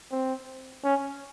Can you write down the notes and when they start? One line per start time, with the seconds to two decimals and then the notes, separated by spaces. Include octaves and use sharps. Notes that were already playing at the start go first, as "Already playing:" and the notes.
0.11 C4
0.84 C#4